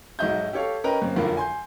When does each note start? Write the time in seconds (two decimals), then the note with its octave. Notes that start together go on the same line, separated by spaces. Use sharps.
0.19 B1 G#2 F#4 D#5 E5 G6
0.53 G4 A4 C#5 F5
0.84 C#4 A#4 B4 D#5 G5 A#5
1.02 F#2 A#3 C4
1.16 F1 B1 D3 F4 A#4 B5
1.37 G#5 C6 G6